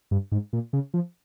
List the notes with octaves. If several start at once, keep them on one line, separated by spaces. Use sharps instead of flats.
G2
G#2
A#2
C#3
F3